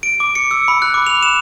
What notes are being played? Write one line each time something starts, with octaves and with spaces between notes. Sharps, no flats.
D7
D6
C#7
E6
B5
F#6
D6
F7
E7